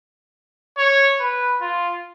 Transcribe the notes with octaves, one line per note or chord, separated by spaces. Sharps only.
C#5
B4
F4